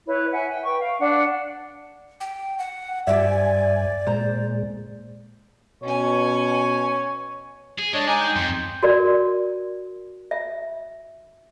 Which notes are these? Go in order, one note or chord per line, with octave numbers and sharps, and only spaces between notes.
E4 B4 C#5
E5 F#5 G#5
G5
B4 G5 C#6
F5
D4 F#5
G5
F#5
G2 G4 C5 D5 E5 G#5
A#2 G#3 C5 A#5
B2 C#4 C#5 G#5
G#4
G#3 D4 C#5 D#5 A5
D#4 G#5 D6
G5
F2 C6
F#4 A#4 D5
E5